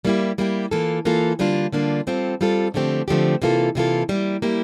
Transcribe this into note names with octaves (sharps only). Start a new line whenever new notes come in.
G3 A#3 E4 G4
G3 A#3 E4 G4
E3 A#3 F4 A4
E3 A#3 F4 A4
D3 G3 A#3 D4 F4
D3 G3 A#3 D4 F4
G3 C4 F4 A4
G3 C4 F4 A4
D3 F3 A3 C4 G4
D3 F3 A3 C4 G4
C3 E3 A#3 F4 A4
C3 E3 A#3 F4 A4
G3 A#3 E4 G4
G3 A#3 E4 G4